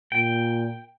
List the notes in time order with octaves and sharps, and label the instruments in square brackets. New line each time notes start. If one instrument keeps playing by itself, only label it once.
[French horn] A#2 [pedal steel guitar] G5